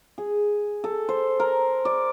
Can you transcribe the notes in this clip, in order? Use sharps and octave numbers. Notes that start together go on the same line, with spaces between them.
G#4
A4
C5
A#4
D5